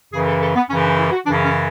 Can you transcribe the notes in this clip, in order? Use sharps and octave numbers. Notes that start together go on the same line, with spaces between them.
F#2 C#3 E3 G#4
A4
A4
B3
F#2 C#3 E3 C#4
D4
E4
F#4
F#2 C#3 E3 D4
C#4